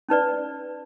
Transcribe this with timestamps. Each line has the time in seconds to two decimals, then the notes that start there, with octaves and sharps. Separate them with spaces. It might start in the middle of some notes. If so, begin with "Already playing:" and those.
0.09 C#4 D#4 B4 D5